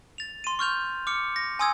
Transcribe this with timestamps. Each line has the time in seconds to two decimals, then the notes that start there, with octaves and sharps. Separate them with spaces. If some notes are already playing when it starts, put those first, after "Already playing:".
0.18 A6 F7
0.44 C6 D#7
0.59 C#6 F6 G6 F7
1.07 D6 F6 C#7
1.36 A#6
1.59 G#5 C6 D#6 E6 G#6